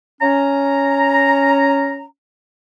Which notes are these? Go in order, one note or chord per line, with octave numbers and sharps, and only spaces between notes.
C#4 A#5